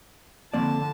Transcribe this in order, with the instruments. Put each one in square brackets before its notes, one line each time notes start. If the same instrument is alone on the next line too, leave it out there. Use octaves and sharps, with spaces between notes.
[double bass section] D3 F3 [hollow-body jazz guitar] A#3 C4 D5 [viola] A5